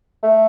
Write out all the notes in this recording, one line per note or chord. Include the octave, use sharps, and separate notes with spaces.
A3